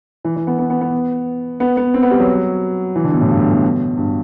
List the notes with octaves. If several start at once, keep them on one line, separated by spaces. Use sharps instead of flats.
E3
E3
B3
B3
B3
B3
B3
B3
C4
B3
G3
F#3
E3
D3
B2
A2
G2
G2
B2
B2
G2